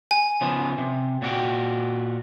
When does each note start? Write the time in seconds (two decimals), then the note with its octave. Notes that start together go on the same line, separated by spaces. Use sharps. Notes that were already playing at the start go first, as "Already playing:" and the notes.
0.11 G#5
0.41 C#3 F3 B3
0.78 C3
1.22 A#2 F#4 G5